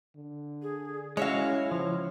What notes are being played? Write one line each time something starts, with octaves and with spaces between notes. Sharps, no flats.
D3
G#4
G#3 C#4 E4 F#4 C#5 E5 F5
C#3 F3